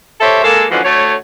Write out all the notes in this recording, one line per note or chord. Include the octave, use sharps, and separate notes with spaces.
G4 A4 C5 C#5 E5
G#3 A#3 A4
D3 E3 F3 G#3 C#4 F#4
D2 A3 F#4 C#5